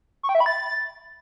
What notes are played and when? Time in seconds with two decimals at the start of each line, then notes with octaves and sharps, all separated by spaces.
0.23 C#6
0.29 G5
0.35 E5
0.40 B5
0.46 A6